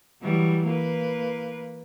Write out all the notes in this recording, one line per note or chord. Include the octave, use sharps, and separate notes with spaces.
E3 F#3 G3
A#3 B4